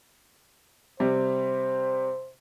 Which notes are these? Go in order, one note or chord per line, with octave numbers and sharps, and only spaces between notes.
C3 G3 C5